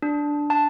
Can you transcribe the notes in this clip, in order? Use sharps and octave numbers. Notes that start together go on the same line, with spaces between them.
D4
A5